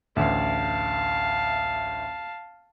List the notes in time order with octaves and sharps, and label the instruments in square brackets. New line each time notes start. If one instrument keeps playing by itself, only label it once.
[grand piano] A1 D2 [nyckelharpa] F5 A5